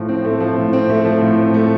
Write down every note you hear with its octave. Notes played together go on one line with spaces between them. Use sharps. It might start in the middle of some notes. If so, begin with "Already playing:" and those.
Already playing: A2 F3
C4
A3
F3
A2
C4
A3
F3
A2
C4
A3